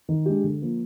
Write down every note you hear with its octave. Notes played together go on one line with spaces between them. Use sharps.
D#3
G#3 D4 G4
D3
F3 A#3